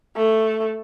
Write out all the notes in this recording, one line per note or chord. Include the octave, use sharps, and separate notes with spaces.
A3